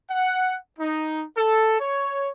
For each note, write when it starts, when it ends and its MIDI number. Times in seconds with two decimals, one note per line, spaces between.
0.10 0.55 78
0.79 1.24 63
1.37 1.78 69
1.80 2.30 73